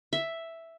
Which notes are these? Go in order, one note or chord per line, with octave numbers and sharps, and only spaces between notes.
E5